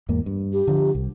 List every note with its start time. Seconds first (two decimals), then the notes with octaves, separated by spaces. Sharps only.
0.09 E2 G#2 A#3
0.26 G2
0.53 G4
0.67 D3 F3
0.95 C2